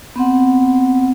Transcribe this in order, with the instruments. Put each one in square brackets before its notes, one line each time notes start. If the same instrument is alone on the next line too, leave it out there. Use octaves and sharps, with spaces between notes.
[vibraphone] B3 C4 F#5